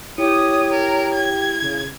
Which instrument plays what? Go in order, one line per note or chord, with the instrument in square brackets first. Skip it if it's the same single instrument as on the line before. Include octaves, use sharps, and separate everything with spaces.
[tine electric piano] E4 [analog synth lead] G4 [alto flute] C#5 [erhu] D#6
[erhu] A#4
G#6
[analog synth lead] C#3